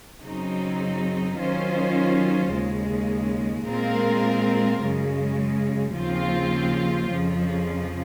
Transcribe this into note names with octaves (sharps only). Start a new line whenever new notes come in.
F#2 C#3 F#3 C4 D#4
D#3 F#3 C#4 F4 C5
D#2 C#3 G#3
A#2 G#3 C4 F4 A#4
F#2 C#3 G#3
D#2 C#3 F3 C4 F4
F2 C#3 F3